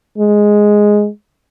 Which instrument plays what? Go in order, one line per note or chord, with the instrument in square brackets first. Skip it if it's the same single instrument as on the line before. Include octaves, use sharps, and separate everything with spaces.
[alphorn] G#3